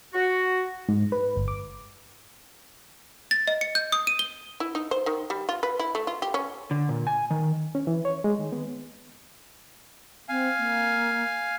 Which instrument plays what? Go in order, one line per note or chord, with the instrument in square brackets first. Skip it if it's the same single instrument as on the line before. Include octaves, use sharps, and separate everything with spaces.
[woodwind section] F#4
[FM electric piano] G#2
B4
G1
D6
[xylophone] A6
D#5
C#7
G6
D#6
D#7
G7
[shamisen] E4
D#4
C5
D#3
G3
F4
B4
E4
A3
F4
G4
C#4
[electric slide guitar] D3
A#2
G#5
D#3
[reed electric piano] C#4
E3
C#5
G#3
D#3
B3
[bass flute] C4 [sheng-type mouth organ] F5 G#5
[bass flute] A#3